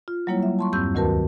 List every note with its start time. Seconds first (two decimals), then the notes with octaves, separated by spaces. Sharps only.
0.08 F4
0.27 F#3 G3 A#3 E4 C#5
0.43 E5
0.59 A5 C6 C#6
0.73 E2 G2 C4 C#6 E6 G6
0.94 D2 D#3 F#4 A#4 B4 A5